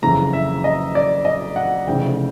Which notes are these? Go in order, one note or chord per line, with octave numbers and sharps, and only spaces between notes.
F#1 F2 C#3 E3 A#5
E5
D#5
D5
D#5
F#5
F1 F2 C#3 E3 G5